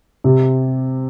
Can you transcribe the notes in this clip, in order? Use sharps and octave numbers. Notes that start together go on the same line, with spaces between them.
C3